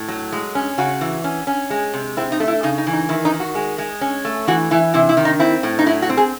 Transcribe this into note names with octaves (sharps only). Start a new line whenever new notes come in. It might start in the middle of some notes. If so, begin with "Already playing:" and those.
Already playing: A2
F#3
G#3
C#4
C#3 F#4
E3
C#4
C#4
G#3
C3
C4 E4
D#4
A3
E4
C#3 D#4
D#4
E3
D#4
D#3 E4
D#4
D#3
F#4
G#3
G#3
C#4
A3
E3 F#4
E3 E4
C3 E4
E4
D#3
D#4
C4 E4
A2
D#4
F#3 E4
F#4
C4
G#4